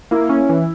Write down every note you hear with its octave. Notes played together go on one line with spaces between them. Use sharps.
A#3 E4
C#4
E3